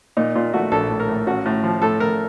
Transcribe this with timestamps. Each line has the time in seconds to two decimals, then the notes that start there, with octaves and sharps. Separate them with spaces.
0.17 A#2 D#4
0.35 A#2 F4
0.53 A3 F#4
0.72 A#1 A4
0.90 A2
1.00 A#4
1.09 A2
1.27 A1 F#4
1.46 A2
1.64 F3
1.82 A2 A4
2.00 A2 A#4